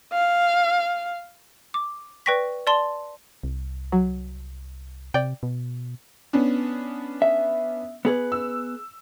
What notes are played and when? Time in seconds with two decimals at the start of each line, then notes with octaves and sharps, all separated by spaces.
0.13 F5
1.74 D6
2.26 B4 D5 G5 C#6 A#6 B6
2.67 D5 A5 C6 G7
3.43 C2
3.92 F#3
5.14 C3 D5 G5
5.43 B2
6.33 B3 C#4 D4
7.22 E5
8.05 B3 G#4 B4
8.32 E6